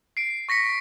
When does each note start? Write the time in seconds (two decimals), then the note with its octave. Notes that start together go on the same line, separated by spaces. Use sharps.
0.17 C7 D7
0.49 C#6 A#6 B6 C#7